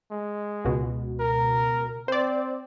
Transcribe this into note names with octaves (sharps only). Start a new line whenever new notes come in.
G#3
C#2 B2
A#4
C4 C5 D5